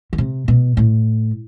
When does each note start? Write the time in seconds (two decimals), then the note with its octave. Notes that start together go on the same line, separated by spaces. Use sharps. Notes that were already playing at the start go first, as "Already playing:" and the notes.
0.13 D#3
0.18 C3
0.48 B2
0.77 A2